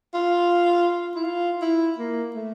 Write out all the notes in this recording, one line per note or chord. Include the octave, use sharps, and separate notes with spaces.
F4
E4
F4
E4
A#3
A3